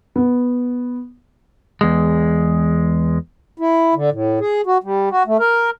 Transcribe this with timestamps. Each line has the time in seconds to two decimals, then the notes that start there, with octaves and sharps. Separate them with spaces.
0.16 B3
1.81 E2 G#3
3.58 E4
3.95 D3
4.12 A2
4.40 G#4
4.66 F#4
4.84 G3
5.11 F#4
5.27 A3
5.39 A#4